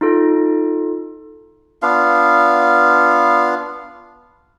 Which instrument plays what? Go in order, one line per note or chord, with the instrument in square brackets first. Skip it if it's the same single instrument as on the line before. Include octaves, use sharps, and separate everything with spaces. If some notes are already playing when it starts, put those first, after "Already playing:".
[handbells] D#4 F4 A4
[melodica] B3 D4 F4 F5